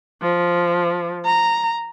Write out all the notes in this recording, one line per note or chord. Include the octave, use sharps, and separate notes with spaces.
F3
A#5